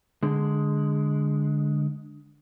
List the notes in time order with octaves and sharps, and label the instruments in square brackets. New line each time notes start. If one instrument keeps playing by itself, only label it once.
[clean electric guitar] D3 G#3